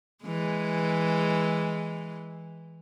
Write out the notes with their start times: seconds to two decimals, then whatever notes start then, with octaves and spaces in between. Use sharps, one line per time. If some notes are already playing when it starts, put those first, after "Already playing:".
0.25 E3 G#3